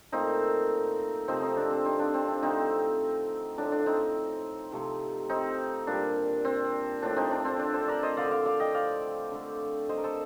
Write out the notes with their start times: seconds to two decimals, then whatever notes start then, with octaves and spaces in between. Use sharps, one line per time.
0.12 A#2 A3 C4 D#4
1.28 C3 F3 A3 C4 D#4
1.42 C4 D#4
1.57 D4
1.71 C4
1.85 C4 D#4
1.99 D4 F4
2.14 C4
2.28 D4
2.42 D3 A3 C4 D#4
3.58 A2 F3 A3 D4
3.72 D4
3.86 C4 D#4
4.72 C3 F3 A3
5.29 C4 D#4
5.87 A#2 G3 D4
6.45 C4
7.02 A2 F3 A3 D4
7.16 C4 D#4
7.31 D4
7.45 C4
7.59 D4
7.74 A4 C5
7.88 A#4 D5
8.03 C5 D#5
8.17 D3 A3 D5 F5
8.31 D5 F5
8.46 D5 F5
8.60 D#5 G5
8.74 D5 F5
9.32 D3 A3
9.89 C5 D#5
9.97 A#4
10.04 A4 C5